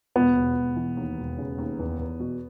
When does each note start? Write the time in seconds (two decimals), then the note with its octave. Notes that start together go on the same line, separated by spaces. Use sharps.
0.16 E1 B3
0.36 E1
0.56 E1
0.76 E3
0.97 D#2
1.17 E1
1.38 C#3
1.58 D#2
1.79 E2
1.99 E2
2.20 B2